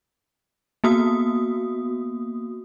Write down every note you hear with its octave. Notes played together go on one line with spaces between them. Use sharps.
A#3 B3 F#4 D#6